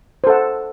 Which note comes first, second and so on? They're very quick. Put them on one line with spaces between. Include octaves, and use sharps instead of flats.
C5 A4 F#5